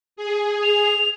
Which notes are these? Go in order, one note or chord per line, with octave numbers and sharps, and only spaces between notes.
G#4
F7